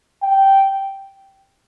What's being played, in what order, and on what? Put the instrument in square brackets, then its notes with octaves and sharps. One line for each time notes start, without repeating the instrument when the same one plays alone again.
[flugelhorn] G5